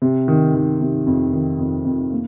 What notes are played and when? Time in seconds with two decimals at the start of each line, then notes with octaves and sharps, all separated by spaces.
0.02 C3
0.28 D#3
0.55 D#3
0.81 C3
1.06 F2
1.33 D#3
1.59 F2
1.85 F2
2.12 A#3